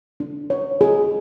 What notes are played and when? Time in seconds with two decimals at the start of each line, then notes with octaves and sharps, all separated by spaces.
0.20 D4
0.50 C#5
0.81 G#4